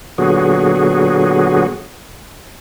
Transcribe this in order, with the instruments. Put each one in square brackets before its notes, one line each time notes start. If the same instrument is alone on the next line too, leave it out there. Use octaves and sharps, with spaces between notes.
[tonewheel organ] A#2 D3 F#3 B3 F#4 G#4